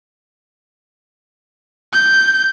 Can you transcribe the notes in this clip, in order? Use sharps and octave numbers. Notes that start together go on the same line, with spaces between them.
G6